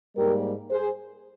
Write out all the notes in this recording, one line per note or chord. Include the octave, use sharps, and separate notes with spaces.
G#2 G3 A#3 G4 A#4
G#4 C5